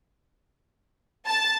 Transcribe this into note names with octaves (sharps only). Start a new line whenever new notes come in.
A5